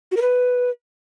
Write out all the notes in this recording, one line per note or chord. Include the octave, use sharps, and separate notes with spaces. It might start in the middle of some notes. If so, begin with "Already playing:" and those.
F#4
A#4
B4